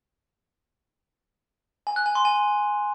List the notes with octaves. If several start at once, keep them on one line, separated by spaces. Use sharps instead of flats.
G#5
F#6
G#5
C6
G#5